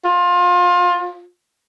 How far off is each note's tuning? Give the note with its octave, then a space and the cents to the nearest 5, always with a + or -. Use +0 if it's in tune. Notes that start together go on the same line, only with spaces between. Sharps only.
F4 +25